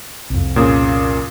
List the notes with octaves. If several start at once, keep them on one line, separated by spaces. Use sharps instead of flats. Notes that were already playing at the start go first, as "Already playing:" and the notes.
C2 F2
A#2 C#3 D#6